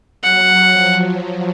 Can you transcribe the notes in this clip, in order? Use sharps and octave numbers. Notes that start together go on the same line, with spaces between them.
F#3 F#5
F3